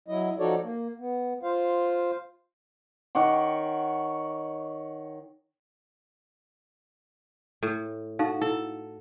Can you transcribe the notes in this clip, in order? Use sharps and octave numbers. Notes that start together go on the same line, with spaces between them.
F#3 E4 D#5
F3 D#4 F#4 A4 C#5 D5
A#3
B3
F4 C5 F5
D#3 C#5 F#5 D6
A2
D#4 F#4 A4 F5
E4 A4